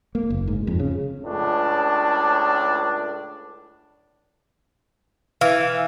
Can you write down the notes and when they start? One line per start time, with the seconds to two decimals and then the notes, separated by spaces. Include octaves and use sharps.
0.15 A#3
0.30 F#1
0.47 G#2
0.67 F2
0.79 C#3
1.25 C#2 A2 D4
5.41 E3 F5